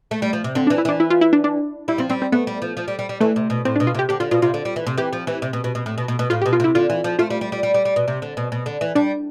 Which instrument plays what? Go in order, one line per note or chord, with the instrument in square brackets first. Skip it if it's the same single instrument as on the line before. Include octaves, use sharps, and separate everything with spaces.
[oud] A3
G3
F3
C3
[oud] D3 [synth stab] C4
[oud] E3 [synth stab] D4
[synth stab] E4
[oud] E3 [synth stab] D4
[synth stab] E4
F4
E4
D4
D4
[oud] G3 [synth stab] E4
[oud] F3 [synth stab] C4
[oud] G3 [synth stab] C4
[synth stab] C4
[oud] A3 [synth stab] B3
[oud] G3
F3
F3
G3
G3
G3
[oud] E3 [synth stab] A3
[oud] C3
B2
[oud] A2 [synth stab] C4
[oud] B2 [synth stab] D4
[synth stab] F4
[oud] C3 [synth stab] G4
[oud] D3 [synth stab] G4
[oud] D3 [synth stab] F4
[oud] B2 [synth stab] F4
[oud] C3 [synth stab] F4
[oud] D3
G3
E3
C3
[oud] E3 [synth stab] G4
[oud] F3
E3
C3
B2
B2
B2
A2
B2
B2
B2
[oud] A2 [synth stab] F4
[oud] B2 [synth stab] G4
[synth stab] F4
[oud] C3 [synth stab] E4
[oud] D3 [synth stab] F4
[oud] E3
F3
[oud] A3 [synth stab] F4
[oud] G3
G3
G3
G3
G3
G3
B2
C3
D3
B2
B2
D3
E3
[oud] G3 [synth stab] D4